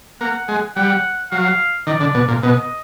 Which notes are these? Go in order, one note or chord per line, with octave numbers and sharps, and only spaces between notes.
A#3 F#5
G#3
G3 F#5
F#3 F5
D#3 D5
D3
B2
A#2
B2 D#5